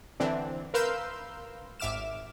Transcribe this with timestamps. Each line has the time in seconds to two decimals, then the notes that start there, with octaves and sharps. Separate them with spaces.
0.20 D3 E3 C4 D4
0.74 A#4 B4 F5 C6 E6 G6
1.80 G#1 E5 D6 F6 E7